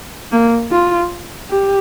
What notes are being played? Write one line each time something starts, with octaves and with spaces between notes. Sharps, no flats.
A#3
F4
G4